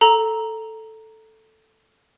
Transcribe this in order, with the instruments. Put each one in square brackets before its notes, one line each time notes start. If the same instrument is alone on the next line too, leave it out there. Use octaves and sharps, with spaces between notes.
[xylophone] A4 A#5